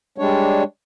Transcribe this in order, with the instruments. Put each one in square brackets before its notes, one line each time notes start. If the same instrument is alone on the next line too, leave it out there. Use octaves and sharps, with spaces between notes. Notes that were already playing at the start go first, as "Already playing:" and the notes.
[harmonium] G3 G#3 D4 C#5